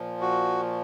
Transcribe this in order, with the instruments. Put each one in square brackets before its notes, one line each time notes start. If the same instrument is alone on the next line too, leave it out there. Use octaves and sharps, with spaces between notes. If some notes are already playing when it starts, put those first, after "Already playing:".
Already playing: [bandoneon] A#2 F3
F#4